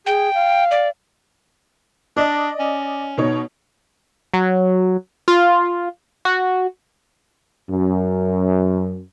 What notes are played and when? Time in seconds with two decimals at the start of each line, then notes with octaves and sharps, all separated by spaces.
0.06 G#4 G5
0.34 F5
0.71 D5
2.17 D4 D5 D#5
2.60 C#4
3.18 B2 D#4 C#5
4.34 F#3
5.28 F4
6.25 F#4
7.70 F#2